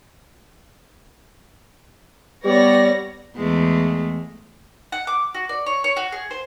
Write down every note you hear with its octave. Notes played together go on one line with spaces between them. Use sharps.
G3 B3 C#5 D5 A#6
E2 G#3 A3
F#5
D6
F#4
D5
C#5
C#5
F#4
G#4
C5